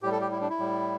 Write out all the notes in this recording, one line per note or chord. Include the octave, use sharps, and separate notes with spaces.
A2 G3 G4
A4
G4
E4
D4
E4
A2 G3